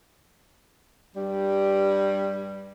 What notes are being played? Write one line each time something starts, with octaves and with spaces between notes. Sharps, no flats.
G2 G3